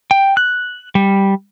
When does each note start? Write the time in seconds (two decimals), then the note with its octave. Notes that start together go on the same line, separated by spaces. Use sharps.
0.11 G5
0.37 F#6
0.95 G3